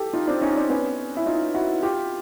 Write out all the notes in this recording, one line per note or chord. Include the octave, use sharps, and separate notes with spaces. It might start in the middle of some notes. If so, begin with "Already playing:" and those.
Already playing: G4 A4
D#4 F4
C4 D4
C#4 D#4
C4 D4
B3 C#4
E4
D#4 F4
E4 F#4
F4 G4